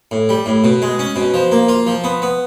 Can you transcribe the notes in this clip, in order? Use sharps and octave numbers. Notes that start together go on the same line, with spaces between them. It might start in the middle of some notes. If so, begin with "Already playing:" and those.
A2
G3
A2
B2
G#3
C#4
B2
F3
A#3
F4
F3
B3
B3